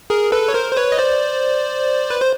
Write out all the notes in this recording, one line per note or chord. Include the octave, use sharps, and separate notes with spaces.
G#4 A#4
A4 B4
C#5
A#4 C5
C5
B4 C#5
D#5
C5 D5
B4
C5